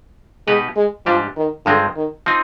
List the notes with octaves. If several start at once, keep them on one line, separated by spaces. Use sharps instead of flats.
B2 G#3 B3 D#4 G4 B4
G#3
G#2 F3 G3 D4 G4
D#3
G2 D3 F3 G#3 C4
D#3
F3 C4 D#4